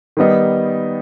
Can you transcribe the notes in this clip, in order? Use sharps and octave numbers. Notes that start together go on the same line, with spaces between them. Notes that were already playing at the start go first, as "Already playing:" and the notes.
D#3 G3 B3 D#4